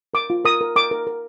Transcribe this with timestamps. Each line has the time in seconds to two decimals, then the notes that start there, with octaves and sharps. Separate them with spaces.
0.14 A#4 D6
0.30 F4
0.45 A#4 D#6
0.61 A#4
0.76 A#4 D6
0.91 A#4
1.07 A#4